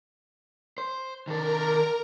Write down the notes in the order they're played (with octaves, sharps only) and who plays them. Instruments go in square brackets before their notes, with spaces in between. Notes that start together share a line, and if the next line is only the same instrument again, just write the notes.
[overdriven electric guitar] C5
[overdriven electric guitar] D#3 A4 [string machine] A#4 A#5